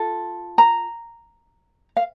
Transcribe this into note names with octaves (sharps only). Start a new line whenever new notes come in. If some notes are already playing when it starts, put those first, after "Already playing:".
Already playing: F4 A4
A#5
F5